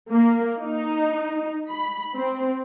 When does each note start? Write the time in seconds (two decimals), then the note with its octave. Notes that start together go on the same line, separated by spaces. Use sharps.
0.10 A#3
0.61 D#4
1.70 B5
2.15 C4